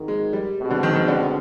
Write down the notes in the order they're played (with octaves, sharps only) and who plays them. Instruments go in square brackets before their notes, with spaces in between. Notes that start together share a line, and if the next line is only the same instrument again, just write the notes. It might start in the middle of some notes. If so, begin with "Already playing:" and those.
Already playing: [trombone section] G#1 G#2 D#3
[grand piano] G#3
G3
[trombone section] C2 B2 G#3 C4
[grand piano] D3
D#3
D#3
D3